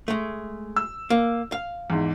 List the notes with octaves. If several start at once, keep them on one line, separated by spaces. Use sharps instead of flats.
G#3 A3
E6
A#3
F5
E2 G#2